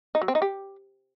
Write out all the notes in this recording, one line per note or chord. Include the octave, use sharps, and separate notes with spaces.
D#4
F#3
C4
D#4
G4